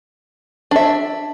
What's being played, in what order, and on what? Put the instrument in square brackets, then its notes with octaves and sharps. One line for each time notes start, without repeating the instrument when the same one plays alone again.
[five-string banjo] D4 E5